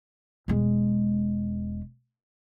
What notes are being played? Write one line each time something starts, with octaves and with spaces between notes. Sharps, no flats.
E1 G#3